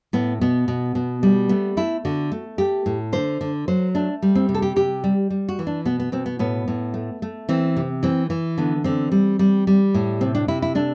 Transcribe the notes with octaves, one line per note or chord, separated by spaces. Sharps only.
A2 B3
B2 B3
B2
B2
G3
A3 B3
A3 E4
D3 F#4
A3
A3 G4
A2
D3 C5
D3
F#3 C5
A3 D4
G3
C4
C3
A4
G4
C3 G4
G3
G3
F#4
E3
D4
B2 B3
B3
B2 C4
B3
A2 B3
A2
A3
A3
E3 C4
C3
E3 C4
E3
D3 B3
D3 C4
G3
G3
G3
A2
C3 C4
D4
C3 E4
E4
A3 D4